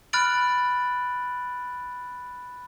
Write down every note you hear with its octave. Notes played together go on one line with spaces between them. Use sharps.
B5 F6 F#6 A6 D7 F#7